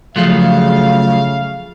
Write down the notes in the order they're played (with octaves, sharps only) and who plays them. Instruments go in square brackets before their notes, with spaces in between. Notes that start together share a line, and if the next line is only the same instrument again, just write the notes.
[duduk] C#3 [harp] F3 G#4 D#6 [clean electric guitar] F#3 A3 F4 [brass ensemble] F5